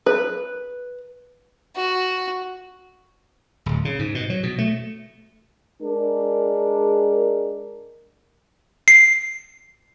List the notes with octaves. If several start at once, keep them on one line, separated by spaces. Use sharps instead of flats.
B4
F#4
D1
C#3
G#2
B2
F#3
B2
A3
G#3 D4 G#4 A#4
C7